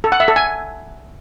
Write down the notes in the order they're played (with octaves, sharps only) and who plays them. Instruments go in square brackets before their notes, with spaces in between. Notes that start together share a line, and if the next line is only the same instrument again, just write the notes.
[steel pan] A4
F#5
E5
A4
G#5